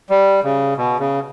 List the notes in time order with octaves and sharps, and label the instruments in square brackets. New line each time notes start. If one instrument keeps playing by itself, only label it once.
[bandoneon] G3
C#3
B2
C#3